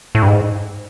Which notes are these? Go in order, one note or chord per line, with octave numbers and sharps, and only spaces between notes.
A2
G2
G#2